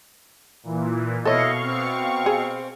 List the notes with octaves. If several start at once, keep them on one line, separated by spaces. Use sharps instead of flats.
A#2 E3
B2 E4 A4 C#5 D#5 F5 C#6
C4
G#4